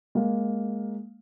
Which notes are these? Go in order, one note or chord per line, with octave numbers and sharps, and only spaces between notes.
G#3 A#3 F5